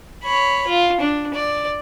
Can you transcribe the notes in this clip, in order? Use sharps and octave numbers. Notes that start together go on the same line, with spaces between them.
C#5 B5
F4
D4
D5